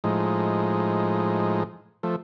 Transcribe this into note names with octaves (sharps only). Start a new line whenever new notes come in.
A2 F3 G#3 D#4
F3 A3